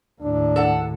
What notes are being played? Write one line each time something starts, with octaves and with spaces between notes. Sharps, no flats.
D#2 A2 D4
A4 F#5